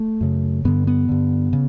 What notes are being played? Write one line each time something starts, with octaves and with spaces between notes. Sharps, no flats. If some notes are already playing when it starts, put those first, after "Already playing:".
Already playing: A3
F#2 C#3
G2 D3 B3
B3
G2 D3
C#3